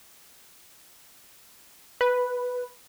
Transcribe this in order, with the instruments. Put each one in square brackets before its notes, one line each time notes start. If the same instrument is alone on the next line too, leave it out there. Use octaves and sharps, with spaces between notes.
[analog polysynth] B4